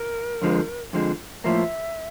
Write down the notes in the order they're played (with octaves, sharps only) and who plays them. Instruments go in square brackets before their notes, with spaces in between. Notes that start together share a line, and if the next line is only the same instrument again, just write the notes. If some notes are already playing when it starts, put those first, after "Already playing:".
Already playing: [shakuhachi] A#4
[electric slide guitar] F2 D3 F3 G#3
F2 D3 F3 G#3
[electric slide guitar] A2 F3 A#3 [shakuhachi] E5